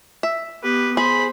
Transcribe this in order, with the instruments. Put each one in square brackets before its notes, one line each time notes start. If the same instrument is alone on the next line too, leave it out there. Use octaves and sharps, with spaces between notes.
[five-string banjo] E5
[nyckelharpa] B3 G4 [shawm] B4
[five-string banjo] G#4 [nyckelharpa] C5 [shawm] B5